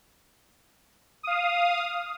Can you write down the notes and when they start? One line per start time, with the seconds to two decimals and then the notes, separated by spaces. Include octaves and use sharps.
1.23 F5 D#6